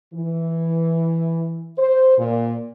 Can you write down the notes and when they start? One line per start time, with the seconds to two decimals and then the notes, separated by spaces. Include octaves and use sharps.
0.14 E3
1.79 C5
2.19 A#2